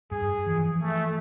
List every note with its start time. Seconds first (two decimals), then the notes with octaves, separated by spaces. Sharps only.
0.11 G2 G#4
0.47 E3 F3
0.82 A3